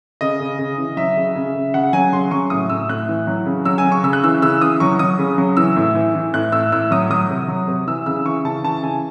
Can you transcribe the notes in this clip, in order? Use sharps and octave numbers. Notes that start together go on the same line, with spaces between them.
C#3 D#5
C#3
C#3
E3
F#3 E5
C#3
C#3
C#3
C#3 F#5
F#3 G#5
C#3 C6
F#3 C#6
A2 D#6
A2 E6
A2 F#6
E3
F#3
C#3
F#3 E6
G#5
C#3
C#6
C#3 E6
F#6
E3 E6
C#3 E6
E3 D#6
F#3 C#6
F#3 D#6
C#3
F#3
E3 E6
A2
E3
E3
A2 F#6
A2 E6
A2 E6
F#3 D#6
F#3 D#6
C3
F#3
C3
E3 E6
C#3 E6
E3 C#6
C#3 A5
E3 A5
C#3 G#5